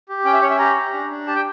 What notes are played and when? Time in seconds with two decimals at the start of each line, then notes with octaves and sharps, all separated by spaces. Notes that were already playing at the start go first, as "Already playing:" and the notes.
0.09 G4
0.25 C#4 G5
0.33 E5
0.42 C#4 C#5
0.50 E5
0.59 G4 A#5
0.76 G4
0.94 D4
1.10 D4
1.27 G4 A5
1.36 G5